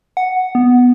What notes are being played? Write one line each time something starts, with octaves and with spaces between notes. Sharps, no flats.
F#5
B3